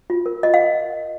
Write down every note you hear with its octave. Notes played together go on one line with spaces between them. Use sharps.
F4
A#4
F4 D#5
F5